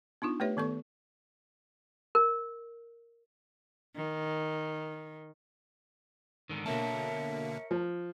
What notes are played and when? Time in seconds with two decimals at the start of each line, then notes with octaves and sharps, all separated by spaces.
0.22 B3 D4 D#4 F4
0.40 A3 G4 B4 C#5 E5
0.57 D#3 B3 A4 C#6
2.15 A#4
3.96 D#3
6.49 G#2 D3 D#3
6.66 B2 D3 A#3 A#4 C#5 E5 A5
7.71 F3